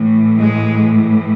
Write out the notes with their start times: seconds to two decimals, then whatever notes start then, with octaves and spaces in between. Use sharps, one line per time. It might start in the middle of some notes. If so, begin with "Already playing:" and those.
Already playing: A2 E3
0.38 G#3